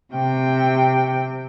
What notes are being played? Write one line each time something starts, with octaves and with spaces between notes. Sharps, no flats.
C3 G5